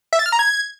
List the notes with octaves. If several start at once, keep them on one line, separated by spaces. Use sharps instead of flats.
E5
A6
F6
A#5
G#6